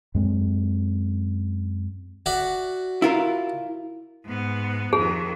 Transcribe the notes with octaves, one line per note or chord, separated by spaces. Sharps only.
F#2 G#3 C4
F#4 D5 E5
E4 F4 A#4
G#2 B3
F2 D#3 G#4